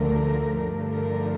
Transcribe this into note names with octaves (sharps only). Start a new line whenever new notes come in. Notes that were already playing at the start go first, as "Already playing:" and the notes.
Already playing: D2 D3 F3 A3 A#4
G2 D3 F3 A3
A#4